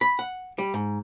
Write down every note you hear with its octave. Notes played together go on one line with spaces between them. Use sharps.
B5
F#5
G3
G#2